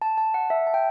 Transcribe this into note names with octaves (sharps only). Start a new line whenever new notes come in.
A5
A5
F#5
E5
A5
G5